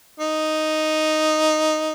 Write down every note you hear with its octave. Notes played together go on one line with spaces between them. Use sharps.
D#4